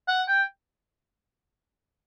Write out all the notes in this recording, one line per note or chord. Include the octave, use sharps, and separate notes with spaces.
F#5
G5